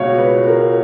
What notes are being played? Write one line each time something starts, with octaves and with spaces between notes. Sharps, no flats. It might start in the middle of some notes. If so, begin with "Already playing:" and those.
Already playing: C#2 B2 C#5 F5
B4
A#4